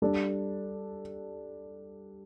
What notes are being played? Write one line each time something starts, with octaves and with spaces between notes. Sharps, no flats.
G3 D4 A4 D5